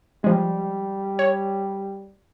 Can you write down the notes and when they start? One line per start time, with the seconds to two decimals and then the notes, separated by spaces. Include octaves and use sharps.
0.24 F3 G3 G#3
1.19 C#5